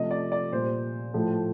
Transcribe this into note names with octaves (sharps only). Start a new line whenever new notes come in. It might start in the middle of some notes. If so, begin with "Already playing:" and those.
Already playing: C3 F3 A3 D#5
D5
D5
A#2 G3 C5
A2 F3 A3